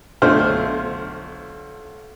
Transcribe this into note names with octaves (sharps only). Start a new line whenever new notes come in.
B1 D3 A3 F4 C5 F6